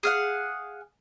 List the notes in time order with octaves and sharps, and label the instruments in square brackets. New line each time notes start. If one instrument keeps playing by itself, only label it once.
[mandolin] G#4 F5 F#5